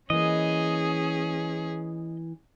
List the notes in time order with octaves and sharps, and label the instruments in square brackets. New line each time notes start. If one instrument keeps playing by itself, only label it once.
[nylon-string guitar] E3 A#3 [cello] C#4 G#4 [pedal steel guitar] D#5